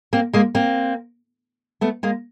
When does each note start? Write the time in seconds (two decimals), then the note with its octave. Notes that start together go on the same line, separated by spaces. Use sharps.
0.13 A#3 C4
0.33 G#3 A#3
0.55 A#3 C4
1.81 A3 B3
2.03 G#3 A#3